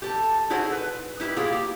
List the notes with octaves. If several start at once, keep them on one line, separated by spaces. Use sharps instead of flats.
G4 A4
D#4 E4 F#4 G#4 A4 C5
B4
D#4 E4 G4 B4
A#3 E4 F4 G4 G#4
G4